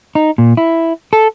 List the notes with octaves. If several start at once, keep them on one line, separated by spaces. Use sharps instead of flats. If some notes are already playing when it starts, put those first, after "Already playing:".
D#4
A#2
E4
A4